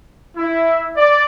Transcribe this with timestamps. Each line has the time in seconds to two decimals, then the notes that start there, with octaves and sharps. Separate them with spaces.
0.36 E4
0.96 D5